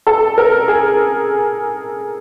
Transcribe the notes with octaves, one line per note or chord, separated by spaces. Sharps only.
A4
A#4
G#4